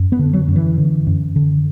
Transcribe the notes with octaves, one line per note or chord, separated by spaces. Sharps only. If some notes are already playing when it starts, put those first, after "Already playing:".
Already playing: F#2
B3
D3
F#3
F#2
E3
D3
F#2
D3